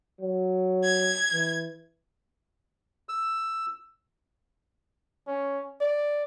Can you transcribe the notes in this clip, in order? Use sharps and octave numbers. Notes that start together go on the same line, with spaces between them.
F#3
G#6
E3
E6
C#4
D5